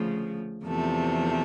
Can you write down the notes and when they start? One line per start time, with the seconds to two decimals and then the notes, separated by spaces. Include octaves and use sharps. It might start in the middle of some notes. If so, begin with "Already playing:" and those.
Already playing: D2 C#3 F3
0.65 E2 C3 F3 A3